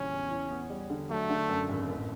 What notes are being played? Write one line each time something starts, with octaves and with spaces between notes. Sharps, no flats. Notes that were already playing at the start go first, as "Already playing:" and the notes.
Already playing: A#1 C#3 E3 G3 C#4
E2
E4
B3
G3
D3
F#3 A3
D3
F#2
G#1
A1